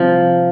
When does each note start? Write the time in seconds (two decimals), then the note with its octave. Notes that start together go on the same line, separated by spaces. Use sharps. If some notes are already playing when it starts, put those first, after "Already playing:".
Already playing: C3 F3 G3 C4